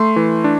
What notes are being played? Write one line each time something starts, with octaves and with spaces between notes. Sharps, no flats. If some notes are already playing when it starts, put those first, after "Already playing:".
Already playing: A3 C6
E3
D4